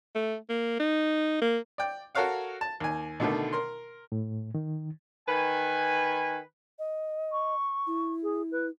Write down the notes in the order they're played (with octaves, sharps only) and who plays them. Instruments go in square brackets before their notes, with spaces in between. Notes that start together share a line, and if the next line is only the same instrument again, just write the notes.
[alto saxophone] A3
A#3
D#4
A#3
[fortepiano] D5 G5
F#4 A4 A#4 C#5 F5 F#5
A5
D#2 G#5
B2 D3 D#3 A3
A#4 C6
[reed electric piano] A2
D#3
[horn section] D#3 B4 G#5
[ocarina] D#5
[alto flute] C#6
[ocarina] E4
[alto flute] G#4
B4